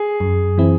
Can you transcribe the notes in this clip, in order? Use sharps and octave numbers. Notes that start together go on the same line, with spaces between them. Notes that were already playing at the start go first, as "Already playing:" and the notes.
Already playing: G#4
F#2
E3 C4 E4